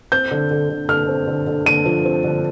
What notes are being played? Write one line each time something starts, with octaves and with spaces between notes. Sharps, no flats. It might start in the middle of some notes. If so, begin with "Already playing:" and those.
C4 G6
D3
D3
D3
D3 F6
C4
D3
D3
D3 D#7
F3
C4
D3